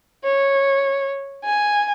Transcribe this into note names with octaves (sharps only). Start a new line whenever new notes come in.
C#5
G#5